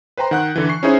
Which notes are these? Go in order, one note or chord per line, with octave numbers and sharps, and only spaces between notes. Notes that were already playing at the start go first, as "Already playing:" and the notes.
B4 C5 G5 A#5 C6
D#3 F#5 F#6
D3 E3
C#6 C7
C#4 D#4 E4 G#4 C5 C#5